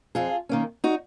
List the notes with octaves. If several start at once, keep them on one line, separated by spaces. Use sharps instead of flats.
F2 F4 G#4
D#3 A#3 C#4
D#4 F#4